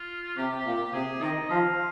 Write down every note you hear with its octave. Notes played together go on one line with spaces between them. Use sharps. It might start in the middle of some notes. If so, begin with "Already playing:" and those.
Already playing: F4
C3 G4
A#2
C3 G#4
D#3 D#5
F3 F5